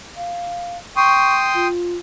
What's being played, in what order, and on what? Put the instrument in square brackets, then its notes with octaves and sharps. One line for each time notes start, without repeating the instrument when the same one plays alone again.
[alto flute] F5
[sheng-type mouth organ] G5 C6 D#6 [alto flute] C#6
[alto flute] F4